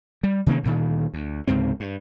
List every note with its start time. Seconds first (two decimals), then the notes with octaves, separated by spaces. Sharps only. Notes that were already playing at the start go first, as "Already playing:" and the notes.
0.23 G3
0.46 C3 D#3 A#3 C#4
0.63 D2 A#2 D#3
1.14 D2
1.48 C#2 G#2 C3 C4
1.80 G2